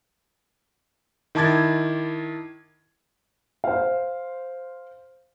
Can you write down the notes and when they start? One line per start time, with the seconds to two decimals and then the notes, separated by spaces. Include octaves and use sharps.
1.35 D#3 E4 A5 D6 G#6 A6
3.64 C5 F5